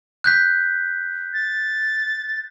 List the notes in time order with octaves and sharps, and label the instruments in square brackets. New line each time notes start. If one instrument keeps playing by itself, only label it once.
[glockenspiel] F#6 G6 B6
[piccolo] A6